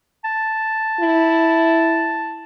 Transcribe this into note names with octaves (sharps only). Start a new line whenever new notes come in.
A5
E4